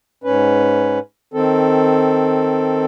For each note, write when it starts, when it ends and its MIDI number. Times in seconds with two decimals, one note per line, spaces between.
0.24 0.99 44
0.24 0.99 61
0.24 0.99 71
1.34 2.85 51
1.34 2.85 60
1.34 2.85 69